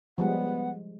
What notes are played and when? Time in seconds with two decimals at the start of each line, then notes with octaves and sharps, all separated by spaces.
0.18 F3 G3 G#3 B3 F#5